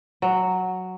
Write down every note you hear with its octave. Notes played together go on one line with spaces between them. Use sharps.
F#3